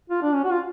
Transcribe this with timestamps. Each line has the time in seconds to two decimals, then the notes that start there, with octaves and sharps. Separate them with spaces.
0.10 F4
0.22 D4
0.34 C#4
0.44 F#4
0.52 F4